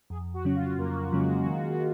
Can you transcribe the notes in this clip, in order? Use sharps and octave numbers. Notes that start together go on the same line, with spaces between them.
F2 G#4
F#4
C#3 F#3 C#4
F4
F2 A#3
C#3 F#3 G#3 C#4
D#3